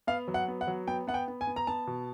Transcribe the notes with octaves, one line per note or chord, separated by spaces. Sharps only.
B3 F5
F#3
F#5
B3
F#5
F#3
B3 G5
B3 F#5
G5
B3
G#5
B3
A#5
B3 A5
B2